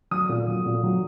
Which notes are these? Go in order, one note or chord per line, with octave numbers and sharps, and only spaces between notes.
F#3 D#6
A#2
F#3
A#2
F#3